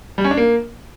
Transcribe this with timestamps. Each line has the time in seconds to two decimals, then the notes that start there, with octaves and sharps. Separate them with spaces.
0.18 G3
0.24 C#4
0.31 D4
0.37 A#3